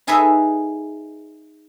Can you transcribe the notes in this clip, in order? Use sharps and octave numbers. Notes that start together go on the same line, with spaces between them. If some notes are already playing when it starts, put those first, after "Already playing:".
D#4 G#4 A4 B4 D#5 E5